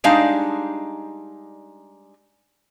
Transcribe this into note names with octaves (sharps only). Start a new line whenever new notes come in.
G3 G#3 D4 D#4 F5